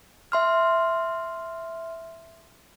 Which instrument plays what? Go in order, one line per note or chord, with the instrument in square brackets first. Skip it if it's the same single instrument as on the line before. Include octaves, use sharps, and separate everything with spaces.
[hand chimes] E5 C6 F6